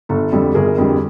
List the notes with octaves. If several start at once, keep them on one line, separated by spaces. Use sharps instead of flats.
G1 A4
F2 D3 G3 A4
G1 G#4 A#4
F2 D3 G3